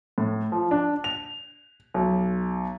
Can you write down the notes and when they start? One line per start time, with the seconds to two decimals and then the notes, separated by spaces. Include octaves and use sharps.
0.18 A2
0.52 F3
0.71 D4
1.04 F7
1.94 B1